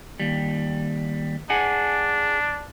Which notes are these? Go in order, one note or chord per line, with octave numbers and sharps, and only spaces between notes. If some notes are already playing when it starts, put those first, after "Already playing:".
D#2 G3
D4 G#4 F#5 G#5